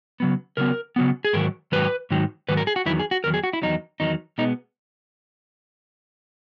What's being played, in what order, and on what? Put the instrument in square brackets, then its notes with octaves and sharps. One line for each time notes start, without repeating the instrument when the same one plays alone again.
[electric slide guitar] C#3 F#3 B3
C#3 F#3 B3 A#4
C#3 F#3 B3
G#4
G#2 D#3 F#3 A#4
G#2 D#3 F#3 B4
G#2 D#3 F#3
G#2 D#3 F#3 B4
A#4
G#4
F#4
E2 D#3 F#3 E4
G#4
F#4
E2 D#3 F#3 A#4
G#4
F#4
E4
E2 D#3 F#3 D#4
E2 D#3 F#3 D#4
B2 G#3 B3 D#4